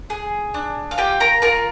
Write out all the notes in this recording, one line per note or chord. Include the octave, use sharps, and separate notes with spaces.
G#4
D4
F5
F4 G4 G5
A#4 A#5
F4 A#4 A#5